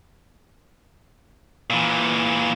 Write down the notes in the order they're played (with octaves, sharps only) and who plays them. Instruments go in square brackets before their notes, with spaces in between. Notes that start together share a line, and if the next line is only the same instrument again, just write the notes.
[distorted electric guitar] A#2 E3